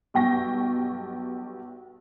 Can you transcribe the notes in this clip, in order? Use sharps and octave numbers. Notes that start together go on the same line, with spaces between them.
B1 G2 B2 G5 C#6 A#6